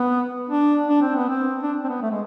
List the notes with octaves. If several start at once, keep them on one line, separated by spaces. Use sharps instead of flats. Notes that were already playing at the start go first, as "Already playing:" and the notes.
Already playing: B3
D4
D4
C4
B3
C4
D4
C4
B3
A3
G#3